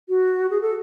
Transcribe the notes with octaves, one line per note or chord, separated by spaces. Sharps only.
F#4
G#4
A4